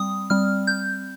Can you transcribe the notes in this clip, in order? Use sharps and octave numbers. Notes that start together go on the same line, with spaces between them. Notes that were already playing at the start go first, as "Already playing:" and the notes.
Already playing: G3 C4 D#6
G3 C4 F6
G6